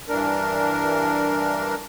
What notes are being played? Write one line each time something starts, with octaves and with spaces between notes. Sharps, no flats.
G2 E3 D4 A#4